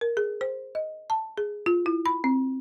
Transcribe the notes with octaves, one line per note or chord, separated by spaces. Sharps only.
A#4
G#4
C5
D#5
A5
G#4
F4
E4
B5
C4